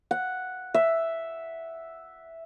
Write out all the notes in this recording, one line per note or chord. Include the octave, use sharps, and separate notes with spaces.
F#5
E5